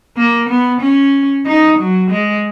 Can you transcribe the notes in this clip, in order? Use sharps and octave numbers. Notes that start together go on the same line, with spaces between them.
A#3
B3
C#4
D#4
F#3
G#3